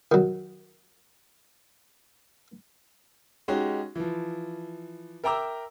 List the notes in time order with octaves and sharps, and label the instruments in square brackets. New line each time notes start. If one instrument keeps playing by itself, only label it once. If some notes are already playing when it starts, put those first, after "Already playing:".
[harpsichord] D#3 F#3
[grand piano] G#3 C#4 D#4 F#4 G4
E3 F3
A#4 E5 G5 A#5 D6 E6